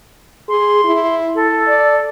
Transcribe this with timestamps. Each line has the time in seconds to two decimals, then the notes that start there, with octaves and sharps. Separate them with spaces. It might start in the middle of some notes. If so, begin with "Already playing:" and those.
0.49 G#4 C6
0.84 E4
1.35 A4
1.67 D5